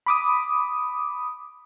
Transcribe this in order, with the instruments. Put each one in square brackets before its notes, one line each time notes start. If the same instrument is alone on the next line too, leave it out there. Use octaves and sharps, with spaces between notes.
[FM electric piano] B5 D6 D#6